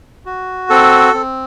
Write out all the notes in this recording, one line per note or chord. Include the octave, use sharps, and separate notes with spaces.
F#4
C4 A4
C4